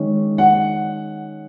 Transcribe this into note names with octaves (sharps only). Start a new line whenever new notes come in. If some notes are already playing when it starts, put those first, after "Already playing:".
Already playing: D#3 G#3 C#4
F#5